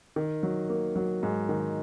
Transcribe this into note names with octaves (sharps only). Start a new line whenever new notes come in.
D#3
F#3
A#3
F#3
G#2
D#3